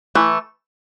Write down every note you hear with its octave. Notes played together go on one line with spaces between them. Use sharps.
E3 A3